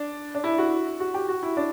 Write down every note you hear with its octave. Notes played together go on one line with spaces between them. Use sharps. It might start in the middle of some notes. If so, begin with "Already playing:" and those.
Already playing: D4
D4
E4
F#4
F#4
G4
F#4
E4
D4